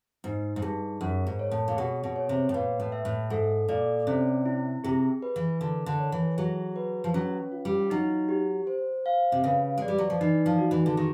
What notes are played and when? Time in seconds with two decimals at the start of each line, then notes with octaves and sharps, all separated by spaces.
0.24 G#2 D#4
0.56 G#2
0.62 G2 G#4
1.01 F#2 A#4
1.27 G#2
1.39 C#5
1.51 A2
1.68 A#2
1.77 B2 G#4
2.04 B2
2.16 C#5
2.29 C3
2.49 A2
2.54 A#2 B4
2.80 A2
2.92 E5
3.05 A2
3.30 G#2 A4
3.69 A#2 D5
4.07 C3 C#4
4.46 E4
4.84 C3 G#4
5.22 B4
5.36 E3
5.61 D3 A#4
5.86 D3
5.99 C#5
6.12 E3
6.38 F#3 G#4
6.76 B4
7.04 F3
7.14 F#3 C#4
7.52 F4
7.65 G3
7.90 F#3 D#4
8.29 G4
8.67 C5
9.06 F5
9.32 C3
9.44 C#3 B4
9.78 G#3 D5
9.88 G3
9.98 F#3
10.10 F3
10.21 E3 D#4
10.46 F3
10.58 F#4
10.71 E3
10.86 D3
10.97 D#3 G#4